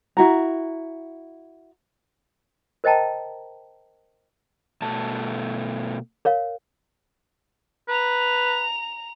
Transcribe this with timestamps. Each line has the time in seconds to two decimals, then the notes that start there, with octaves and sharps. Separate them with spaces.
0.17 E4 F#4 A#5
2.84 A#4 C5 D#5 G5 A5 A#5
4.82 B2 A3 A5
6.25 A#4 C#5 F5
7.89 B4 A#5 F7